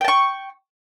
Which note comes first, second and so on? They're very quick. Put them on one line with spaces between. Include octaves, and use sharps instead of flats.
G5 A5 C#6